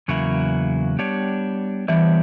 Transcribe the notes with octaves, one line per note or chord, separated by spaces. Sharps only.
E2 C#3 F#3 A#3 E4
G3 B3 D4 G4 C#5
E3 G3 B3 D4 G4 C#5